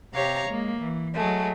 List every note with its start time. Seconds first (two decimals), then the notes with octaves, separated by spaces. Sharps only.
0.12 C3 G4 C#5 F5 A#5
0.47 G#3 A#3
0.79 E3
1.14 F#3 G#3 A3